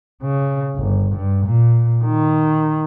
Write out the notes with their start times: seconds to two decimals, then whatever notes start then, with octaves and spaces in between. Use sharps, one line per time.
0.23 C#3
0.77 G1
1.16 G2
1.46 A#2
2.05 D#3